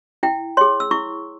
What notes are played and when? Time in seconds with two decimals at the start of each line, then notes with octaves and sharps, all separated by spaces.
0.23 E4 G5
0.57 G#4 C#5 C6
0.80 E6
0.91 E4 C#6